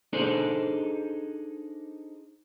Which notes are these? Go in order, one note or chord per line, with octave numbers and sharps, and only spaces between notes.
D4 D#4 G#4 A4 C5 D5